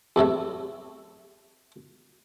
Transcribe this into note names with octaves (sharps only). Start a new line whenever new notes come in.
E2 A2 C3 A3